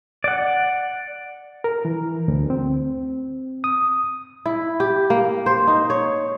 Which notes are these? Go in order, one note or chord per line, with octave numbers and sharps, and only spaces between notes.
D5 F#5
A#4
E3
D2
C4
D#6
E4
G4
A#3
C5
D#4
C#5